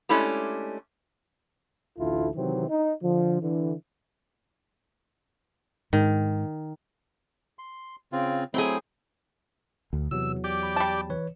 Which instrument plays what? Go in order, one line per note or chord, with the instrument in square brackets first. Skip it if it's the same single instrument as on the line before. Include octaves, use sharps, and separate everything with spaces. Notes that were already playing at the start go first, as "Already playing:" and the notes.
[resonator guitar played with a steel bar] G#3 A3 C#4 D4 E4 G4
[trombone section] A1 D2 E4 F4 A4
C3 D#3 E3 F#3 C4
D#4
D3 F3
D3 E3
[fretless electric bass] G#2 [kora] D#3
[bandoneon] C6
C#3 C4 F4
[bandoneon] F#3 A3 E4 [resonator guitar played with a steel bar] C4 G#4
[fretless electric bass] D2
[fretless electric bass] E2 F#3 [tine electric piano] C3 E3 [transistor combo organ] E6
[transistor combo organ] G4 D5 [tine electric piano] D6
[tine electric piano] B5
[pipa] G3 A5
[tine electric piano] E3 B4 C#5